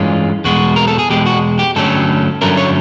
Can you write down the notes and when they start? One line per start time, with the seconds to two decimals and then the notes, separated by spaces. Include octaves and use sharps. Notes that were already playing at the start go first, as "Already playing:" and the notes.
Already playing: G2 E3 G#3 C#4 F4
0.44 E2 B2 G#3 F#4
0.76 A#4
0.87 A4
0.99 G#4
1.10 E2 B2 G#3 G4
1.26 F#4
1.59 G4
1.76 G2 D3 F#3 A3 C#4 A4
2.41 G2 D3 F#3 A3 C#4 A#4
2.58 C#5